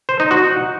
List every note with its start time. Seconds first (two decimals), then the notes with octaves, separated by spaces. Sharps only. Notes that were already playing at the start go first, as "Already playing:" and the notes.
0.09 C5
0.20 D#4
0.31 F#4